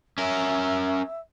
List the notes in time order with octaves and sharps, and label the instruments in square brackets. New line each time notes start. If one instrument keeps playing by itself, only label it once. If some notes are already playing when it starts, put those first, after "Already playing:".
[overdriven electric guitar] C#4 A#4 [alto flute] E5